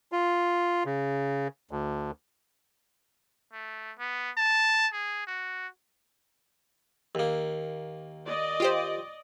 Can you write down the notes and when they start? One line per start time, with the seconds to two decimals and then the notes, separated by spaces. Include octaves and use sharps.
0.12 F4
0.86 C#3
1.71 D2
3.53 A3
3.99 B3
4.38 A5
4.93 G#4
5.27 F#4
7.15 D#2 A#3
8.26 D5 D#5
8.60 F4 G4 C5